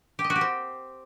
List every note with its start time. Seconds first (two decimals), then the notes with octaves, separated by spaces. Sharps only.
0.19 G4
0.24 D#5
0.30 F#4
0.36 G4
0.41 C4